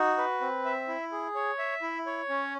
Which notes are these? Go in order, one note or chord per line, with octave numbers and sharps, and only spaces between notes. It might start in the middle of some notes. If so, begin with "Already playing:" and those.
Already playing: D#4 F#4
B4
C4
E5
E4
G#4
C#5
E5
E4
C#5
C#4